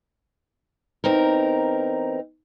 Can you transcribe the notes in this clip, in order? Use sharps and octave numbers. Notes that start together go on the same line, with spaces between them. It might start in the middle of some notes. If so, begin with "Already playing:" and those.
E2 C4 D#4 A#4